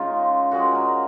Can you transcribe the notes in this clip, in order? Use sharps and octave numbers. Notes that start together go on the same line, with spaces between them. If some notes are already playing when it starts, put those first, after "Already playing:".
Already playing: C#3 G#3 D#4 F4
A#2 F3 G#3 F#4
A#4